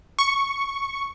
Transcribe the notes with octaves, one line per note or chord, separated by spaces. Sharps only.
C#6